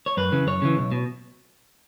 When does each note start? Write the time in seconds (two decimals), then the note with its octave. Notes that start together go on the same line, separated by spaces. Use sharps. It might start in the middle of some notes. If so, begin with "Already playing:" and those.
0.06 C#5
0.17 F#2 B4
0.32 C#3 E3
0.47 F#2 C#5
0.62 C#3 E3
0.77 B1
0.92 B2